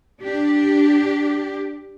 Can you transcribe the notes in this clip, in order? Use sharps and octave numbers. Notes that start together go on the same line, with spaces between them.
D4 G4